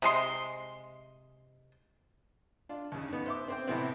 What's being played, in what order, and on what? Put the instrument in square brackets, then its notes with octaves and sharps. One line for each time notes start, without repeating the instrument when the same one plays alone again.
[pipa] C3 G#3 C6
[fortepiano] D4 F4
D#2 C#3
G#2 B3
C5 E5 D6
C4 C5 G5
A2 C3 E3 B3 C4